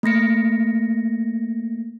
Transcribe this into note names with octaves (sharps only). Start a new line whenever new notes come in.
A3 A#3 A#6 C#7